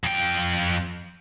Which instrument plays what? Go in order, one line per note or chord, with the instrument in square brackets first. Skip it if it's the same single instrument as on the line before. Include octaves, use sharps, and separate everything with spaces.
[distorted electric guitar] F2 G5